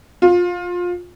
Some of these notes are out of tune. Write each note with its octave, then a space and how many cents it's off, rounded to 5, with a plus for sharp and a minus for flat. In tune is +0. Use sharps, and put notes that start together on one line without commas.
F4 +20